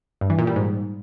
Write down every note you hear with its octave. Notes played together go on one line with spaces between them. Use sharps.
G2
E3
A#2
G3
G#2